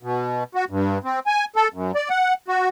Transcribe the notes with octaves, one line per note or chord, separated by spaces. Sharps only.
B2
F#4
G2
C4
G#5
A4
F#2
D5
F#5
F#4